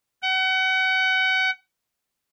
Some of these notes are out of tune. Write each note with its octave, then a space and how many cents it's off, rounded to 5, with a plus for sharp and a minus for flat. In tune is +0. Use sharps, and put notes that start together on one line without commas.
F#5 +35